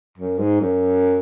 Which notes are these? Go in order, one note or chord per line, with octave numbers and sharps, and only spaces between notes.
F#2
G#2
F#2